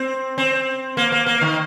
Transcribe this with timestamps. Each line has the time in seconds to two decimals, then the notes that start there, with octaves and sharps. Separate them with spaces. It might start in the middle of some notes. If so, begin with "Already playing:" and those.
Already playing: C4
0.38 C4
0.97 A#3
1.12 A#3
1.26 A#3
1.41 D#3